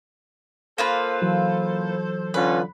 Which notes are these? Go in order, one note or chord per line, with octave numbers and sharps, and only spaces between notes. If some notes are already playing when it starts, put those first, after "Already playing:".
A#3 F4 A4 B4 C5
E3 F#3
D3 C#4 F4 B4